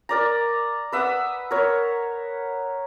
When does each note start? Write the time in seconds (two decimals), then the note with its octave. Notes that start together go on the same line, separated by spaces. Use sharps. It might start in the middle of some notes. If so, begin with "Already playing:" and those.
0.09 A#4 D5 A#5
0.92 B4 E5 F#5 D#6
1.51 A#4 C#5